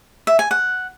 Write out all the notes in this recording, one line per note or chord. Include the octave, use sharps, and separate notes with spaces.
E5
G#5
F#5